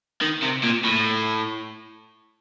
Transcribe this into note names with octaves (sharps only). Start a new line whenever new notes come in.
D#3
C3
A#2
A2